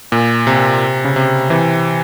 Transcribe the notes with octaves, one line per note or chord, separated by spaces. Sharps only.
A#2
C3
C#3
C3
C3 E3